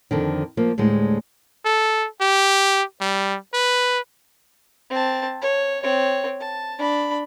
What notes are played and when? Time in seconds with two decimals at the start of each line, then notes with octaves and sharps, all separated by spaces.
0.11 F2 D3 D#3
0.57 F3 A#3
0.78 D2 A2 G3 G#3
1.65 A4
2.21 G4
3.01 G3
3.54 B4
4.90 C4 A5
5.41 C#5
5.82 C4 C#5
6.40 A5
6.78 D4 B5